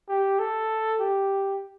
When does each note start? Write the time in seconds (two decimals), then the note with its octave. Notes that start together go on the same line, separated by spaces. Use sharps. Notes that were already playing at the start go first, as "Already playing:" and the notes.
0.09 G4
0.39 A4
1.00 G4